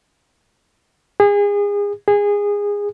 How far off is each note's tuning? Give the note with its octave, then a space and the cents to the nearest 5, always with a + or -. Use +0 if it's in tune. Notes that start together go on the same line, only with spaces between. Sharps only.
G#4 -30
G#4 -20